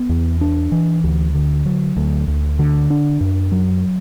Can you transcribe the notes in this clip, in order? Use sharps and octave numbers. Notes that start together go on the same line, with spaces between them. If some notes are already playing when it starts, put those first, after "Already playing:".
Already playing: B3
E2
D4
E3
D2
D3
F#3
D2
D2
D3
D4
F#2
F#3